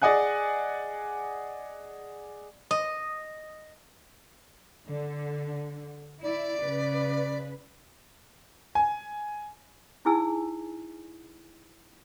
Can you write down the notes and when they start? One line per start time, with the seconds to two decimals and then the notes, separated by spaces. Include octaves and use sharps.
0.02 G#4 D5 D#5 F#5 G#5 F#6
2.71 D#5
4.88 D3
6.22 E4 D5
6.62 C#3 B4
8.75 G#5
10.05 D#4 E4 G#4 G#5 E6